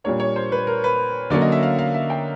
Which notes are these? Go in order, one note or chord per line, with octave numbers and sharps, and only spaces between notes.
A#2 G3 A#3 D4 C#5
C#5
C5
B4
A#4
B4
D3 F#3 A#3 C#4 D5
D#5
E5
F5
F5
E5
G5